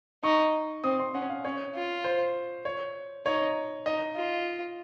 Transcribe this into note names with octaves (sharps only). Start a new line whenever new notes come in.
D#4 C#6
C4 D#6
C6
C#4 F#5
F5
C#4 C#5
F4
C5
C#5
D#4 C#5
D#4 D#5
F4